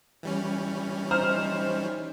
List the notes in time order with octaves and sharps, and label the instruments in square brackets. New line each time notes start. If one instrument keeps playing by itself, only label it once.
[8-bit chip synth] E3 G3 C#4
[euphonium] D#4 [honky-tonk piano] C5 F6